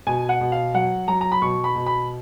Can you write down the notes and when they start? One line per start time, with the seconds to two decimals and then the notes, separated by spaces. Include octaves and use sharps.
0.07 B2 G#5
0.29 F#5
0.41 B2
0.52 F5
0.74 F#3 F#5
1.08 F#3 A#5
1.21 A#5
1.32 B5
1.42 B2 C#6
1.64 B5
1.76 B2
1.86 B5